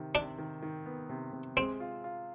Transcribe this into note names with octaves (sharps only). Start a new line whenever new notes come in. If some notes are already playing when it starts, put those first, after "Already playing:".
Already playing: C3 D#3
C3 D4
D#3
D#3
B3
C3
C3
G#3 C4
F4
F4